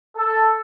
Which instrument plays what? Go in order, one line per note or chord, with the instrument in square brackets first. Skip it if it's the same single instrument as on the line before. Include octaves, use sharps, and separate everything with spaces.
[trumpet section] A4